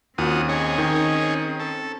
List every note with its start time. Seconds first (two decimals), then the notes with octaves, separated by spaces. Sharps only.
0.18 D#2 C4 C#4 F4 F#4 D#6
0.49 D#4 G#4 C#5
0.78 D#3
1.60 A4